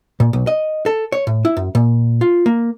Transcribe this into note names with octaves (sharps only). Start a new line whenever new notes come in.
A#2
B1
D#5
A4
C#5
A2
E4
F#2
A#2
F4
A#3